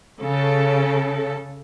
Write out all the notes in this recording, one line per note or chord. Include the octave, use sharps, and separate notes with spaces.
C#3 A4